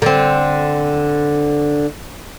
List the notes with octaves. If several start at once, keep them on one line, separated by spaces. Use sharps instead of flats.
D3 C4